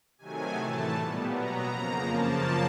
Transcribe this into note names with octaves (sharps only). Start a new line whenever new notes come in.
C3 D#3 F#3 A3 G#5
A2 E3 A3 A5
A#2 G3 B3
B2 F#3 B3 A#5
F2 C#3 F3 A#3 A#5
F#2 C#3 F3 A#3 A5